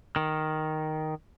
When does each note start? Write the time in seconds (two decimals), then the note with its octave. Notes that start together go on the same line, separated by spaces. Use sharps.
0.16 D#3